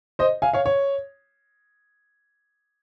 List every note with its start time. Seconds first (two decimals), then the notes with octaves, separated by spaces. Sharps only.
0.19 C5 D#5
0.42 F5 G#5
0.53 C#5 F5
0.66 C#5